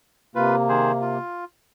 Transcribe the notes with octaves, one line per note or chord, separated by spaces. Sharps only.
C3 A#3 F4 B4
D#3 G#4 C5
F4